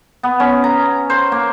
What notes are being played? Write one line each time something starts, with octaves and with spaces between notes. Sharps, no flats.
B3
C#4
A#5
C5
A#3